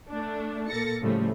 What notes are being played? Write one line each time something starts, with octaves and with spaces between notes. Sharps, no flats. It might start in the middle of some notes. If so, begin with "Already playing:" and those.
A3 D4
A#2 A#3 A4 A6 A#6 C#7
A2 C#3 F3 G3 A3